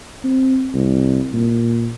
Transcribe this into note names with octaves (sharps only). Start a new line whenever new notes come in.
C4
C2
A#2